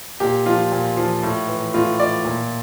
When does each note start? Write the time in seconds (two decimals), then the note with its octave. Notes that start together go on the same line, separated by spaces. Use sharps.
0.20 A#2 G4
0.46 F3 F4
0.72 A#2
0.97 F3
1.23 A2
1.48 E3
1.74 A2 F4
1.99 E3 D5
2.25 A#2